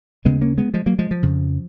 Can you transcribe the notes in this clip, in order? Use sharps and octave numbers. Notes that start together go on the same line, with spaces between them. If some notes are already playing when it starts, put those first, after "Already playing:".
D#2 C#3 G#3 B3
A#3 C#4
G#3 B3
F3 G#3
F#3 A#3
F3 G#3
F3
F2 C#3